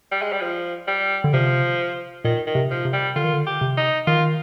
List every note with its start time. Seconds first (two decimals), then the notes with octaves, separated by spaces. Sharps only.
0.12 G3
0.22 G#3
0.33 G3
0.42 F3
0.88 G3
1.24 D3
1.33 C3 F3
2.24 A#2 D#3
2.47 D#3
2.55 C3
2.71 F3
2.85 C3
2.93 G3
3.16 D3 F4
3.24 D#3
3.33 D3
3.47 G4
3.61 C3
3.77 D#4
4.07 D#3 F4